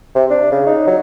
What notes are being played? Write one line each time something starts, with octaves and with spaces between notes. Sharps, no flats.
C3
D4
C#3
D#4
F#3